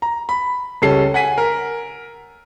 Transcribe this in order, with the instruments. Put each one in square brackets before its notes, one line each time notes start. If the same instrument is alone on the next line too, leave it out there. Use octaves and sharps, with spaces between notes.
[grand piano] A#5
B5
C#2 G3 C#4 A4 C7
F#5 G#5 B6 D#7
A#4